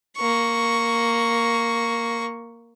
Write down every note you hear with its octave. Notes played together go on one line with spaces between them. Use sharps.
A#3 C#6